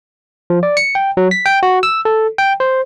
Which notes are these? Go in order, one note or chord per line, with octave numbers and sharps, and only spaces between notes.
F3
D5
C#7
G5
F#3
B6
G5
F#4
E6
A4
G5
C5